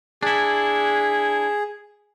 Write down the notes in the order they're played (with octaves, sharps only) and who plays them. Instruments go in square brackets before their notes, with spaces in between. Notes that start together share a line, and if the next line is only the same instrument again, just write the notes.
[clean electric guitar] D4 E4 [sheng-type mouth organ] G#4